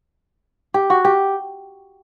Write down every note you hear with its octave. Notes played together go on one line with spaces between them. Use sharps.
G4
F#4
G4